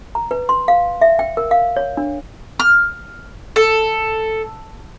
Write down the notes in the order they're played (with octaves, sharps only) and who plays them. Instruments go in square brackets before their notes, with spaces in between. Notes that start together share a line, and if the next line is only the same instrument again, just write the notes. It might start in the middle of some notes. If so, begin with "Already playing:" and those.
[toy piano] A#5
B4
C6
F5
E5
G5
A#4
F5
C#5
D4
[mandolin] F6
A4